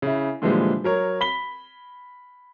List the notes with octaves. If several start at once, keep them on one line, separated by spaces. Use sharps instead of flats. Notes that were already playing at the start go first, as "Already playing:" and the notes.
C#3 E4
A#2 D3 E3 F3 G3 G#3
F#3 A#4 C#5
B5 B6 G7